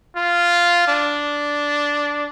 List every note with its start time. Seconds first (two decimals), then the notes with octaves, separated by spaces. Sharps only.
0.16 F4
0.88 D4